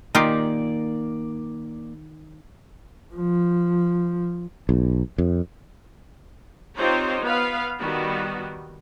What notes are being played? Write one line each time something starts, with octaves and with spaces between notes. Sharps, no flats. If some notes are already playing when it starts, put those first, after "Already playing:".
D#3 A#3 D#4 F4 G4 D5
F3
B1
F2
C4 D#4 F4 G4 C5 C#5
B3 B4 F5
D#3 G3 B3 F#4